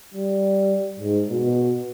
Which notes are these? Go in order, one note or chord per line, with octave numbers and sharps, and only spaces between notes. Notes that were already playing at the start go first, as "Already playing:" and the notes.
G3
G#2
B2